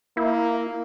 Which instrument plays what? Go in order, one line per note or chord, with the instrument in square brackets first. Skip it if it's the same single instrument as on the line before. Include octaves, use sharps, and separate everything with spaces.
[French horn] A#3 [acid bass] E4